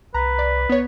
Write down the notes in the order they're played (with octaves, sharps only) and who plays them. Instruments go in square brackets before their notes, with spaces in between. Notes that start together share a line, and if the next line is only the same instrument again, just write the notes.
[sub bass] C2 [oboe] B4 [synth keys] A#5
[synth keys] D5
B3 C#5